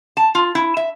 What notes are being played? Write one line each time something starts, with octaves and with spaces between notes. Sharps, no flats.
A5
F4
E4
E5